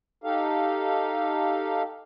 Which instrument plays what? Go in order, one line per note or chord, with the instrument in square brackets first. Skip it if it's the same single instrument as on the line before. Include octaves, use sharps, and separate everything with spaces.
[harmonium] D#4 G4 A4 F5